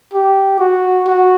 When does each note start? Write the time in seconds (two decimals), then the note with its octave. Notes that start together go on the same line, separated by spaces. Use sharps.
0.14 G4
0.59 F#4
1.07 F#4